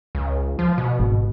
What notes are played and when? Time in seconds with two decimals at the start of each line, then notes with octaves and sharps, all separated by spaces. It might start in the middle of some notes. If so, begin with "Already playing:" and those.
0.15 C#2
0.59 F3
0.78 B2
1.00 G#1